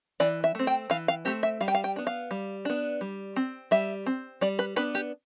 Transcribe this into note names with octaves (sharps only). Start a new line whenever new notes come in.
E3 D5
E5
A3 C4
G5
E3 F5
F5
A3 C4 G4
E5
G3 F5
G5
F5
G5
B3 D4
F5
G3
B3 D4
G3
C4
G3 E5
C4
G3 D5
B4
B3 D4 B4
G4